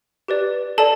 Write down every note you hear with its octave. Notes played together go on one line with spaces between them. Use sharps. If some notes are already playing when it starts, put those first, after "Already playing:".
G4 B4 D5
A4 D5 A5